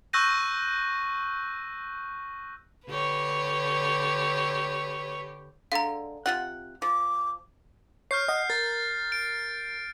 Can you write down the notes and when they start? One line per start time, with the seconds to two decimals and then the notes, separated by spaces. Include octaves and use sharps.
0.13 C#6 E6 F#6 G6 A#6 D#7
2.88 D3 G4 B4 C#5
5.72 D3 G#3 F5 A#5
6.26 C3 F4 F#5
6.82 F3 D6
8.11 C#5 F6 G6 C7
8.28 D#5 F#5
8.50 A#4 A6
9.12 D7